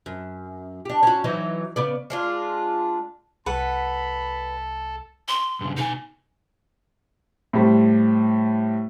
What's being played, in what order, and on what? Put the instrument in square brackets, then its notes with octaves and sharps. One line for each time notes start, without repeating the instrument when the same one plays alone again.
[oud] F#2
D4 G4
C#4 F#4
E3 F#3 D#4
C#3 B3 D5
[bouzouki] G#3 D4 F4
[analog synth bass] C2 [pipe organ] A4 [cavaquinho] B4 F#5 [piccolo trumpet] B5
[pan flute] C6
[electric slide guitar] G2 C#3
[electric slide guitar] B2 A4 G#5 [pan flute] D#4
[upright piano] A2 G3 C5